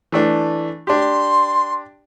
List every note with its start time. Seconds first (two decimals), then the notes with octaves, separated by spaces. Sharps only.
0.12 E3 A3 D4
0.87 D4 G4 C6